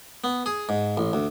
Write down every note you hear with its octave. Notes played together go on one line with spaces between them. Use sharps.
B3
G#4
G#2
A1
D2